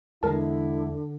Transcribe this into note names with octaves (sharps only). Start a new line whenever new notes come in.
E2 D3 G#3 E4 A#4 A5